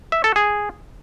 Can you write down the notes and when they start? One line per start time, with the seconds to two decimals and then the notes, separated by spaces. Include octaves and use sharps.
0.12 E5
0.24 A4
0.36 G#4